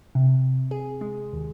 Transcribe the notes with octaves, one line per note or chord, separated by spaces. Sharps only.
C3
G#4
G#3
D#2